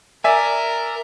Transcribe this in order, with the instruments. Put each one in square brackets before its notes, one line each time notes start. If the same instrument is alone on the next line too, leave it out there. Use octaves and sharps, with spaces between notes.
[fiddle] A#4 [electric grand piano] D5 E5 G#5